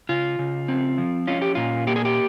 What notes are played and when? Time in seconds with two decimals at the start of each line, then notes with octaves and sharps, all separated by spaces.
0.09 C#3 F4
0.39 C#3
0.68 C4
0.98 F3
1.27 C#4 F4
1.42 G4
1.55 A#2 F4
1.87 A#3 G4
1.96 G#4
2.05 G4